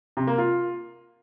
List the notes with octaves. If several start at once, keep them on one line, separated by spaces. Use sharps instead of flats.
C3
A#3
F4